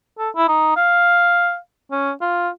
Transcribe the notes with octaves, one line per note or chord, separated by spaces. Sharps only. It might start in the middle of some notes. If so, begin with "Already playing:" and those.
A4
E4
D#4
F5
C#4
F4